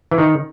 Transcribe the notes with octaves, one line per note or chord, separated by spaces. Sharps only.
E3
D#3